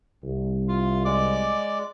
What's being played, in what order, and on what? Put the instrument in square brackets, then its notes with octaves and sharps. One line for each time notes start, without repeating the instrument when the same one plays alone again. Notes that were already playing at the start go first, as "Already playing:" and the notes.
[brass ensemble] C2
[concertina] F4
G#3 D5 D6